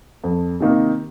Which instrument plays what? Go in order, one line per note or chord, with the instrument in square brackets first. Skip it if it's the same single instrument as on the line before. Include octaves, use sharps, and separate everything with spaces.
[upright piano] F2
C3 D#3 A#3 D#4